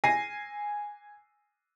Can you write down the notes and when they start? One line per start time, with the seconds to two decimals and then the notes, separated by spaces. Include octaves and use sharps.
0.04 G#5 A#6 C7 D#7